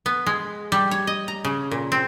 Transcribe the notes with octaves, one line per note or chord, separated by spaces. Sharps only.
B3
G#3
G3
C#5
D#5
A#5
C#3
A#2
C4